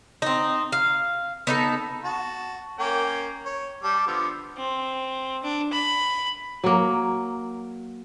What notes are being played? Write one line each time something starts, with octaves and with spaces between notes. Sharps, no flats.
C4 D#4
F5
B3 D#4 A4
F#4 A5
A#3 C#4 G5
C#5
G3 A5 D6
D3 F3 B3
C4
D4
B5
F#3 A#3